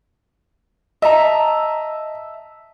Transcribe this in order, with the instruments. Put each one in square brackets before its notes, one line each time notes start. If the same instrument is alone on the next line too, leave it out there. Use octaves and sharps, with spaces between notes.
[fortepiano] D#5 [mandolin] E5 A5 A#5